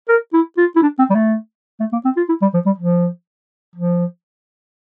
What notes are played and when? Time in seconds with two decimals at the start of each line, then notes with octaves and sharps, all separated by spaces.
0.09 A#4
0.33 E4
0.58 F4
0.76 E4
0.82 D4
0.98 C4
1.10 G3
1.15 A3
1.80 A3
1.93 A#3
2.05 C4
2.17 F4
2.29 E4
2.42 G3
2.54 F3
2.66 G3
2.78 F3
3.76 F3